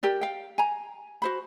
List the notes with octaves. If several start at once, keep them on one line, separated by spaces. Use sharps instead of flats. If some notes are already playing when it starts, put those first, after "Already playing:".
G4 A#4 D5
F5 G5
G#5 A#5
F#4 C5 B5